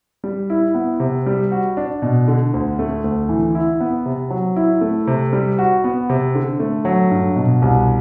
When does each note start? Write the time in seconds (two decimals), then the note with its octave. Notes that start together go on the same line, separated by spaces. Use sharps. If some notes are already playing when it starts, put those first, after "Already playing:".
0.24 G3
0.50 E4
0.74 B3
1.00 C3
1.26 G3
1.52 F#4
1.77 D4
2.02 B2
2.28 D3
2.54 D2
2.79 A3
3.04 D2
3.29 E3
3.55 E4
3.80 B3
4.06 C3
4.30 F#3
4.56 E4
4.81 A3
5.07 C3
5.33 G3
5.59 F#4
5.84 B3
6.10 C3
6.35 D3
6.60 A3
6.85 F#3
7.11 G2
7.36 B2
7.62 C2